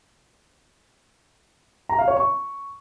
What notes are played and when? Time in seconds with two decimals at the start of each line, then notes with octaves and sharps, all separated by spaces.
1.89 A#5
1.99 F5
2.08 C#5
2.17 C#6